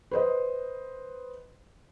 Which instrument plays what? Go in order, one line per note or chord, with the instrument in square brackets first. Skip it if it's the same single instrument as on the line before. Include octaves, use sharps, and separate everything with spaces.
[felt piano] B4 C5 D#5